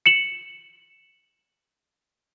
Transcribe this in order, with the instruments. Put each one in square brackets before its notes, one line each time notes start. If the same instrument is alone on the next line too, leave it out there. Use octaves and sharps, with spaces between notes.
[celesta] C#7 E7 F#7